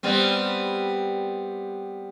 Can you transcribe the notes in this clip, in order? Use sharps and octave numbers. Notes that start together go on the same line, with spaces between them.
G3 B3 C4